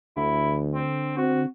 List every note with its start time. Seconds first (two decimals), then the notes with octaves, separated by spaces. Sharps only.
0.17 D2 D3 E4
0.75 C4
1.17 C4 F#4